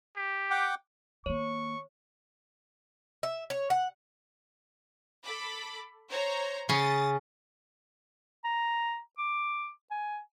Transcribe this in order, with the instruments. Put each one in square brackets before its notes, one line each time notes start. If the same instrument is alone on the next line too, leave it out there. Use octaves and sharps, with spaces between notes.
[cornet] G4
[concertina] F#5 G5 D6
[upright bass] D#3 A#3 [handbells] C#5 [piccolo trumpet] C#6
[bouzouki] E5
C#5
F#5
[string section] A4 B5 D6
C5 C#5 A#5
[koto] C#3 C#4 [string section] D#6 A6
[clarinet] A#5
D6
G#5